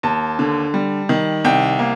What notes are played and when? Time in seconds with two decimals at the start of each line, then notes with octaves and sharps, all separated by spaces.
0.03 D#2 A5
0.39 D3
0.74 G3
1.09 D#3
1.45 C2 G5
1.79 A#3